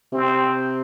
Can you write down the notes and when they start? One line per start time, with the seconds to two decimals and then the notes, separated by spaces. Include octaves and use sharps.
0.12 C3 C4